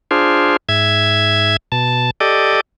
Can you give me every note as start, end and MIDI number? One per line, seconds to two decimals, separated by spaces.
0.11 0.56 62
0.11 0.56 65
0.11 0.56 68
0.11 0.56 72
0.69 1.56 44
0.69 1.56 76
0.69 1.56 92
1.72 2.10 47
1.72 2.10 81
2.20 2.61 67
2.20 2.61 69
2.20 2.61 74
2.20 2.61 75